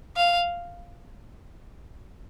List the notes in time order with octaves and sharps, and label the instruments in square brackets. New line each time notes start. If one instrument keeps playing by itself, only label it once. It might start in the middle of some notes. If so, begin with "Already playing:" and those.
[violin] F5